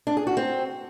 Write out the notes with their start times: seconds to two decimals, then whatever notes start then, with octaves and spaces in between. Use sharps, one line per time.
0.07 D4
0.17 G#4
0.27 F#4
0.37 C4